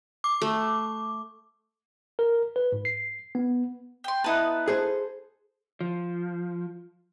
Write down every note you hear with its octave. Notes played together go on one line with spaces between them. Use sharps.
D6
A3
A#4
B4
G#2
C7
B3
G5 C6
B3 D#4 E4 B4 A5
G#4 A4 C5
F3